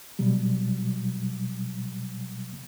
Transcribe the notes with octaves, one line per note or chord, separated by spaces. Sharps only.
B2 F#3 G3